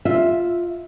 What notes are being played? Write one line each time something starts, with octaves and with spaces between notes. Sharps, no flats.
F4 E5